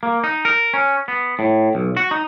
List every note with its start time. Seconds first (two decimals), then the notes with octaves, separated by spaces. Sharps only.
0.03 A#3
0.24 D#4
0.45 A#4
0.74 C#4
1.08 B3
1.39 A2
1.75 B1
1.97 F#4
2.11 D#4